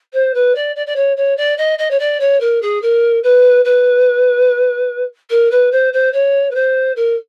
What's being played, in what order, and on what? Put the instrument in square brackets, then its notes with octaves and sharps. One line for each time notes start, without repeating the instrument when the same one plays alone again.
[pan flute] C5
B4
D5
D5
D5
C#5
C#5
D5
D#5
D#5
C#5
D5
C#5
A#4
G#4
A#4
B4
B4
A#4
B4
C5
C5
C#5
B4
C5
A#4